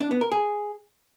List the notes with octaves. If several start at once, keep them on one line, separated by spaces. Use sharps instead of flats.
D4
B3
A#4
G#4